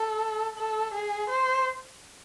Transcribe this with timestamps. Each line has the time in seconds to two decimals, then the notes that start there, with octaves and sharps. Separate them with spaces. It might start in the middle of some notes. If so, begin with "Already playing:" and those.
Already playing: A4
0.58 A4
0.94 G#4
1.29 C5